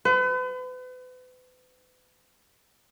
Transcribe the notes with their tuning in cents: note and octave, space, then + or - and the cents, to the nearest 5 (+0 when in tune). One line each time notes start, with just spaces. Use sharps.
B4 +40